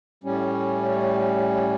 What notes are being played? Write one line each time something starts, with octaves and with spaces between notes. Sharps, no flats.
A2 G3 C#4